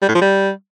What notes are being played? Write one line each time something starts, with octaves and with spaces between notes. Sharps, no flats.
G3
A2
F3
G3